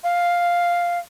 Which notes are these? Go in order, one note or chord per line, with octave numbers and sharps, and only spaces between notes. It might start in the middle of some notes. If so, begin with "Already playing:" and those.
F5